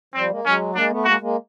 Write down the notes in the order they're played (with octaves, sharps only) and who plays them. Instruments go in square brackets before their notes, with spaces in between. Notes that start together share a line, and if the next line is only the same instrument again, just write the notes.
[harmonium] F3 G3 [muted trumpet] C4
[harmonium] G#3 A#3
[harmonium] F#3 G#3 [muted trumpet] C#4
[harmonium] G#3 A#3 [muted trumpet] D4
[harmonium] A3 B3
[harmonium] G#3 A#3 [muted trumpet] F#4
[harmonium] G#3 A#3